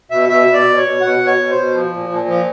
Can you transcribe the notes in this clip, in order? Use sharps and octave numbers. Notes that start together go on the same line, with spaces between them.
B2 E5
B2 E5
B2
D5
B2
C#5
B2
B2 F#5
B2
C#5
B2
C5
B2
F3
A#2
A#2
F3